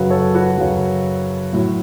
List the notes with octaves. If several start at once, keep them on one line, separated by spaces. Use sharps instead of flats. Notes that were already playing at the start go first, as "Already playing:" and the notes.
Already playing: F#2 C#3 F#3 F#4 B4
A4 C#5
F#4 B4
F#2 C#3 F#3
A2 F#3